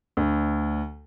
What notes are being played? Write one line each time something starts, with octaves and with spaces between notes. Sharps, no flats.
D2